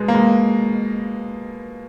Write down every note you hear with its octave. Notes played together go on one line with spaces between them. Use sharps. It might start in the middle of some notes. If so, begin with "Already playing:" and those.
Already playing: B2 G#3
A#3
G#3